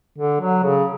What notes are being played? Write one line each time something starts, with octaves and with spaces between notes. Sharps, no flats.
D3
F#3
C#3